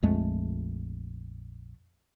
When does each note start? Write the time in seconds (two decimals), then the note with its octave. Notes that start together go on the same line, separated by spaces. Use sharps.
0.03 A#1 F2 G#3 A3